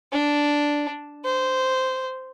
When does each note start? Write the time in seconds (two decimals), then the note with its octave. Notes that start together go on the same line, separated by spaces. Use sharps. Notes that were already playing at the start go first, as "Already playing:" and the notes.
0.12 D4
1.25 C5